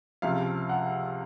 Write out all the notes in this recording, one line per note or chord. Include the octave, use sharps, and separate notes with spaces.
C#2 C3 F3 F5
F#5